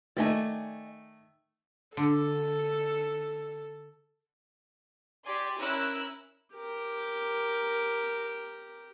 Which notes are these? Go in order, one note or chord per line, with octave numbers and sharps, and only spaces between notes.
D#3 A3 D5 D#5 G#5
D3 A4
G4 D5 G#5 C6
C#4 E4 A#4 E6 F#6
G4 A#4